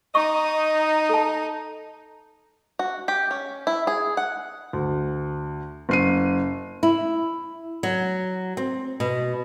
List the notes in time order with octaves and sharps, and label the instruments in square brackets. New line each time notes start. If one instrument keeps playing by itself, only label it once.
[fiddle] D#4 [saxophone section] D#5 [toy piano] C#6
[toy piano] A4 A5
[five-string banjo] F#4
G4
C#4
E4
G#4
F#5
[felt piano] D2
F#1 C7 D#7
[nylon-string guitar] E4
F#3
C4
B2